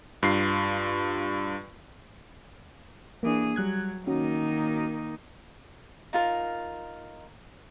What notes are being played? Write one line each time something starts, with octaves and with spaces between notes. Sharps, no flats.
G2 F4 C7
E3 A#3 D4 G#4
F#3 G3 F#6 G#6
D#3 A#3 C#4 D#4 F#4
D#4 F4 A#4